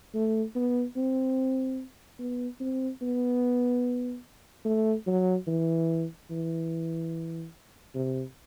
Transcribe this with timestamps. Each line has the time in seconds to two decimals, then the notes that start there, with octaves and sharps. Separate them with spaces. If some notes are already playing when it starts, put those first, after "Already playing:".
0.14 A3
0.55 B3
0.96 C4
2.19 B3
2.60 C4
3.02 B3
4.65 A3
5.07 F#3
5.47 E3
6.30 E3
7.94 C3